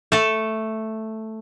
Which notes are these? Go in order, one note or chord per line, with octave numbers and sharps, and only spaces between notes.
A3 A4